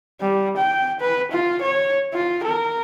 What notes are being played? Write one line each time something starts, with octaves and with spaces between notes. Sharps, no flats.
G3
G5
B4
F4
C#5
F4
A#4